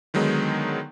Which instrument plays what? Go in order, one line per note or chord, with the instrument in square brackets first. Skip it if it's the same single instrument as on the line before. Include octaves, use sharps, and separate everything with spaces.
[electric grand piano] D3 D#3 F#3 G#3 B3 D#4